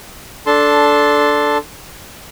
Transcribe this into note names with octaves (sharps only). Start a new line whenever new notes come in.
D4 A4 A5 C6